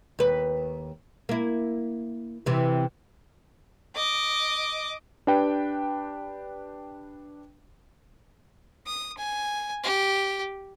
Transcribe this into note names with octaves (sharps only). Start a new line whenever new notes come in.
D#2 B4
A#3 E4
C3 E3
D#5 D6
D4 G4 B4 G5
D#6
G#5
G4